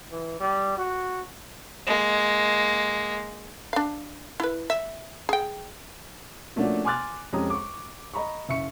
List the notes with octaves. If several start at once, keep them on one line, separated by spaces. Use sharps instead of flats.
E3
G3
F#4
G#3 A#3
D4 F5
E4 B4
E5
G#4 G5
F3 A3 A#3 C#4 D4 F#4
G#5 C6 D6 F6 F#6 A6
F2 G#3 C#4 G4 A#5 D#6
C#6 D6
D#5 A#5 B5 C#6
F#1 E5 C#6 C#7